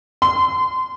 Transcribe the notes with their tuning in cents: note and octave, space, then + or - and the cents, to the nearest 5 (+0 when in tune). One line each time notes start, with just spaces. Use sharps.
C6 -25